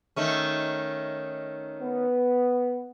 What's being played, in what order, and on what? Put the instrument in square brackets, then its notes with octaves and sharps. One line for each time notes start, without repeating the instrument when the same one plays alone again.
[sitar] D#3 A3 C#4
[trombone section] B3